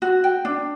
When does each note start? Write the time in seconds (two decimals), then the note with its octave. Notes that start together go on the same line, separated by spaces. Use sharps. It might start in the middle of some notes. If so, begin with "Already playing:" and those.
0.02 F#4
0.24 G5
0.45 D4